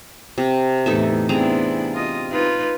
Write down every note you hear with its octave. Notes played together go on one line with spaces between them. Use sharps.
C3
E2 A2 E3 D#4 A4 E5
B3 C4 D4 E4 G#4 A#5
F4 D#5
D#4 F4 B4